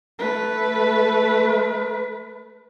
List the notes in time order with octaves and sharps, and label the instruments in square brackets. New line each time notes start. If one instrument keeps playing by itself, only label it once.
[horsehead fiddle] A3 B4